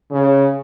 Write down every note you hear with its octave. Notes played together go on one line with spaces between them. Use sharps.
C#3